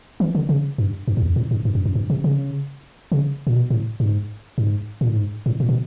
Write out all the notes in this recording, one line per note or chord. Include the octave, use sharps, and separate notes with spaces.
E3
D3
C#3
G2
G2
G#2
E2
F2
A2
G#2
G2
F#2
F#2
G2
C3
C#3
C#3
A#2
B2
A2
G#2
G#2
A#2
A2
G#2
A2
A#2
B2